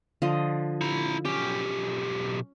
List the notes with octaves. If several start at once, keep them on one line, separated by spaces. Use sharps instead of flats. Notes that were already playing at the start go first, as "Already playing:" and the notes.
D3 F3 D#5
E4 A#5
B1 C#4 G4